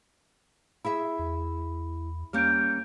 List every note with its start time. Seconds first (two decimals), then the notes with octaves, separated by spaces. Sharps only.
0.85 E4 G#4 E5 B5
1.19 E2
2.33 G3 A#3 C#4 F6 G6 D7